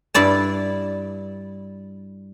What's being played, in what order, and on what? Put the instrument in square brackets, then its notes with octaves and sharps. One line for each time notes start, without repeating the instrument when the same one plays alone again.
[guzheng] G2 E4 D5 A5